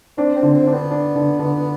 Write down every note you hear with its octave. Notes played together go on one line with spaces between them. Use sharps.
C4 D4
C4
D3
C4
D4
B3
D4
D3
D3